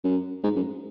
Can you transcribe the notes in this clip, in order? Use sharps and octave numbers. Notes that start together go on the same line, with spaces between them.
F#2
G#2
F#2